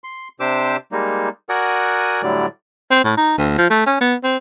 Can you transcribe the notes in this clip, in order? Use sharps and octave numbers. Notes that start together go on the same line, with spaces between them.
C6
C3 D4 G4 C5 D6 E6
G3 G#3 A#3 D#4
F#4 A#4 D5 F#5 G#5 D#6
A2 D3 F#3 G3 D5
C4
A2
D#4
D2
F3
A3
C#4
B3
C4